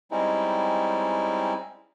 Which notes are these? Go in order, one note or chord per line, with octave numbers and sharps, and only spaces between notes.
G3 G#3 C4 C#4 D#4 E4